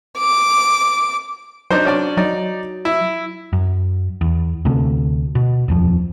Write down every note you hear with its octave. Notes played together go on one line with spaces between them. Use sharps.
D6
F#3 D4 D#4 C5
C#4 D4 D5
F#3 D#4 D5
E4
F#2
E2
D2 C3 A3
B2
D#1 F2 F3